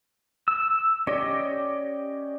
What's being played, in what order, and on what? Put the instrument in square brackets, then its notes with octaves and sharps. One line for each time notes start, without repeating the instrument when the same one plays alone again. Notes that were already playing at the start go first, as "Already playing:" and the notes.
[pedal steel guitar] E6
[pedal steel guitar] C#4 G4 D#5 [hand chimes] D5